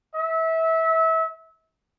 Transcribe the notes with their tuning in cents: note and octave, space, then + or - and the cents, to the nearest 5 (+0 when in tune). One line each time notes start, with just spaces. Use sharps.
E5 -25